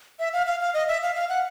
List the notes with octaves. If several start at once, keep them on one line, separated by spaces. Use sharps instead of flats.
E5
F5
F5
F5
D#5
E5
F5
F5
F#5